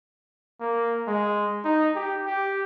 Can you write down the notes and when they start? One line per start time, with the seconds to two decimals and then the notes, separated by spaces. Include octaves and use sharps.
0.61 A#3
1.07 G#3
1.64 D#4
1.96 G4
2.26 G4